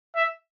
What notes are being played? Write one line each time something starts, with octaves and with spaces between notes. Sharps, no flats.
E5